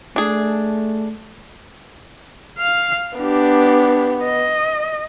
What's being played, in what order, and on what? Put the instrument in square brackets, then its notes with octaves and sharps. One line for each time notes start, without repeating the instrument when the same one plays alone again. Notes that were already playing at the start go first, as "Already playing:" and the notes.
[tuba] A3 [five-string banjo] D4 G#4
[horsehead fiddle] F5
[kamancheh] B3 [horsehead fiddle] D4 G4
[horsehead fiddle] D#5